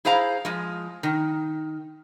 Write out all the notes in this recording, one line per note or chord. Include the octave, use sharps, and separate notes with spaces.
E4 G#4 C5 F5 A#5
F3 G#3
D#3